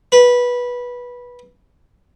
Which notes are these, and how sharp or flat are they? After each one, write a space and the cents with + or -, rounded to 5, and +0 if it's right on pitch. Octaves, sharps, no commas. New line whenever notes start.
B4 -15